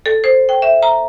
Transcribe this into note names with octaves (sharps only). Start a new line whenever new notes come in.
A4
C5
G5
E5
A#5